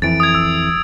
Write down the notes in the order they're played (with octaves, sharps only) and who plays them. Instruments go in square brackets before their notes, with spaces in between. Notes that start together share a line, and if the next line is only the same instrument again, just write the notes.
[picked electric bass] F2 E3 [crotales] A6 D7
[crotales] D#6 G#6
E6